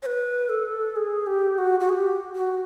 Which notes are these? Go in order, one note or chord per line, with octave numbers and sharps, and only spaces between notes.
C#5
B4
A4
G#4
G4
F#4
F#4
G#4
G4
F#4